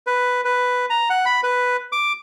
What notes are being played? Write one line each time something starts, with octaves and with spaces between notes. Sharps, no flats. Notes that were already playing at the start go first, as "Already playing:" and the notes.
B4
B4
A#5
F#5
B5
B4
D6